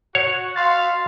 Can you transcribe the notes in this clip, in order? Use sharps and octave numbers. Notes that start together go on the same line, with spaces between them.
F#4 C#5
F5 C6 A6